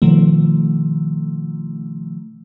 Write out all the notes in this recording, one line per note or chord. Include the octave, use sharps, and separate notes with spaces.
B2 D#3 F3 A3